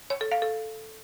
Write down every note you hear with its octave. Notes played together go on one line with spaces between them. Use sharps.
C#5
A4
F5
A4